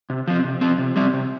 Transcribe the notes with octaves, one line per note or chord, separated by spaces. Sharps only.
C3
F3 C4
C3
F3 C4
C3
G3 C4
C3